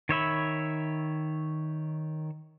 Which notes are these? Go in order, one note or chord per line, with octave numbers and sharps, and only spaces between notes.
D#3 C#5 E5 B5